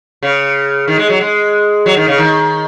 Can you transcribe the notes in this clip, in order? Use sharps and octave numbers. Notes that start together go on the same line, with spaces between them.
C#3
D#3
G#3
F#3
G#3
F#3
D#3
C#3
D#3